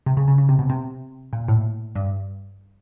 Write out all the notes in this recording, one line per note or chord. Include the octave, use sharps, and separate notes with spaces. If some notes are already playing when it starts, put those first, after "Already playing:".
C3
C#3
C#3
C#3
C3
B2
C3
A#2
A2
G2